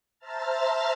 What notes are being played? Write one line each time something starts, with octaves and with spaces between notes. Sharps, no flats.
C5 E5 A5 A#5 F6 A6